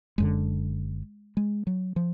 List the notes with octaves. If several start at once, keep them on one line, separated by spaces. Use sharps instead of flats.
F#1 F#2 D3 G#3
G#3
F#3
F3